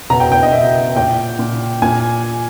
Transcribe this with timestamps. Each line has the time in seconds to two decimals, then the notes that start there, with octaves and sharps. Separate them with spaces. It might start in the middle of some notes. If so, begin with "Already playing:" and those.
0.10 B2 A#5
0.20 G5
0.32 G5
0.43 D#5
0.53 B2 E5
0.96 A#2 G5
1.39 A#2
1.82 A#2 G#5